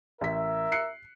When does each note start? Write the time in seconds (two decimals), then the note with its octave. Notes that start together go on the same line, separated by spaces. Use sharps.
0.21 A1 A#4 E5 B6
0.72 F#6 C7 C#7